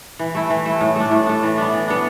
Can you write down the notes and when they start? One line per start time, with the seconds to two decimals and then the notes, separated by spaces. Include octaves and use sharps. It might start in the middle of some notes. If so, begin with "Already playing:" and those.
0.19 E3
0.35 A3 E4
0.50 E3
0.66 A3 E4
0.81 A2
0.96 A3 D4
1.11 A2
1.27 A3 D4
1.43 E3
1.58 B3 D4
1.74 E3
1.88 B3 D4